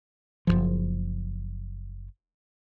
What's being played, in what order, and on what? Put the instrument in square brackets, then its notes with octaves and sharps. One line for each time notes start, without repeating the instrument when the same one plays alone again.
[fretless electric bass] F#1 B1 F3